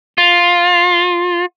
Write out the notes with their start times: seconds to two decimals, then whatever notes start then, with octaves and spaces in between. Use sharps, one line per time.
0.18 F4